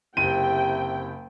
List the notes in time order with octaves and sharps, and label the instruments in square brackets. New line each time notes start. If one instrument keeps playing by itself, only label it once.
[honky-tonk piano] F#1 [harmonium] C3 E4 [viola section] G5 [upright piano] D#7